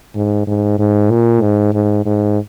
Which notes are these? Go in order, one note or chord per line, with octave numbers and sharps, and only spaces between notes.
G#2
G#2
G#2
A#2
G#2
G#2
G#2